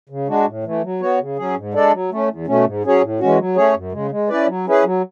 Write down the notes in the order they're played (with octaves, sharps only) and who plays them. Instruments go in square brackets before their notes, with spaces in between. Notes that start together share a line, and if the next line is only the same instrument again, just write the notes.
[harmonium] C#3
G#3 D4 F#4
A2
E3 A3
F#3
B3 F#4 C#5
C#3
F#3 C#4 G#4
G#2
G#3 D4 A4 D5
F#3
A3 C#4
E2
B2 A3 C#4
G#2
F#3 C#4 G#4 C#5
A2
E3 G#3 C#4 F#4
F#3
A3 C#4 G#4 C#5
F#2
C#3 G#3
G#3
C#4 E4 B4 D5
F#3
C#4 E4 G#4 B4
F#3